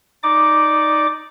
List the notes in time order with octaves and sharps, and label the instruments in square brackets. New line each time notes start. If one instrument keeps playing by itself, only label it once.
[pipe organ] D#4 D5 D6